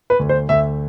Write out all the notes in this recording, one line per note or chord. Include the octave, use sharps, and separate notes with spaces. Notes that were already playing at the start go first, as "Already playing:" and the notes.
B4
D2
C5
D2 E5